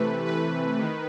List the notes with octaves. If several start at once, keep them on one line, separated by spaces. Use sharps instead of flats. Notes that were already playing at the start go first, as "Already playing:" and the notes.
Already playing: C3 E3 A3 B4
B4
D#3